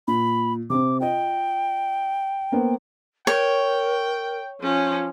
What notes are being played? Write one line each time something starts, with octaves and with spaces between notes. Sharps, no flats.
A#2 B5
C3 C4 D6
F4 D#5 G5
A#3 B3 C5
A#4 C#5 G5
F3 C#4